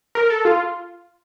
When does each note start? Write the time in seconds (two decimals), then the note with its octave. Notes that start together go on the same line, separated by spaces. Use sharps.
0.15 A#4
0.30 A4
0.45 F4